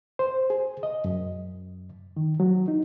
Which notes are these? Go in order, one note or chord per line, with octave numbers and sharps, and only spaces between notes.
C5
G#4
D#5
F#2
D#3
F#3
D#4